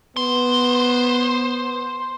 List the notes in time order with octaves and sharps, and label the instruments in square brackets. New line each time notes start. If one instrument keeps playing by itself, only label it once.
[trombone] B3 [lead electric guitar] C5